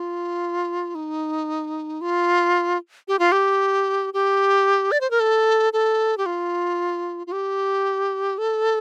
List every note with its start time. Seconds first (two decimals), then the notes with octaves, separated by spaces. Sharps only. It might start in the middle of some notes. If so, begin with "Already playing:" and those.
Already playing: F4
0.95 D#4
2.01 F4
3.08 G4
3.19 F4
3.32 G4
4.14 G4
4.92 D5
5.01 C5
5.11 A#4
5.20 A4
5.73 A4
6.18 G4
6.26 F4
7.27 F4
7.32 G4
8.38 A4